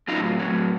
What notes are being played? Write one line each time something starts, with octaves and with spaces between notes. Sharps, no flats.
A2 F#3 D#4 F4
A2 F#3